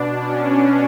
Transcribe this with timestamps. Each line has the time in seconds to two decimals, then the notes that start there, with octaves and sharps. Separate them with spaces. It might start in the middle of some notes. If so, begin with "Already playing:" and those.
Already playing: B2 D4
0.18 C#4
0.51 C#4